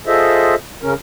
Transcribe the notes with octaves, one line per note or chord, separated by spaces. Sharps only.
F4 G#4 A4 C5 D#5 E5
C#3 C#4 A#4